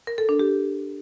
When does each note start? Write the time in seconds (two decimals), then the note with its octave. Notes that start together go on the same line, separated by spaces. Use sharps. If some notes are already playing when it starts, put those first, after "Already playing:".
0.07 A#4
0.18 A4
0.29 D4
0.39 G4